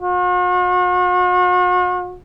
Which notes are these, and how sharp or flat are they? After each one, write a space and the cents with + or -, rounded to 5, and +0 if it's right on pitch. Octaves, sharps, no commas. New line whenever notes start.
F#4 -45